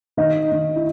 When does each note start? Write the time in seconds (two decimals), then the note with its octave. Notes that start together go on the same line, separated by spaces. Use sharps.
0.17 D#3 D#5
0.52 D#3
0.76 E4